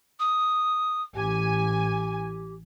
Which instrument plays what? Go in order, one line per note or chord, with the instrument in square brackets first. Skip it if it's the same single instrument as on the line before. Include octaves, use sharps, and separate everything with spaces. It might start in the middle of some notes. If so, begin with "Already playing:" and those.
[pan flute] D#6
[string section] A1 G#5 [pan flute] G4